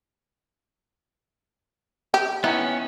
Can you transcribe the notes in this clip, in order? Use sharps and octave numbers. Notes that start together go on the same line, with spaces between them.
G4
D#3 E3 B3 C#4